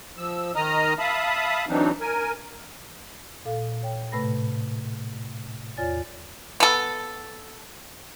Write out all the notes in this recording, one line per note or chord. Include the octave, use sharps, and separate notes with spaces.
F3 E6
D#3 D#5 A#5 D#6 F6
E5 F5 A5 B5 D#6
E3 F#3 C4 D4 D#4
A#4 G#5
A#2 A4 F5
C#5 G5
A2 C3 A3 B4 B5 A#6
E2 F4 C#5 D5 G#5 A6
B3 A4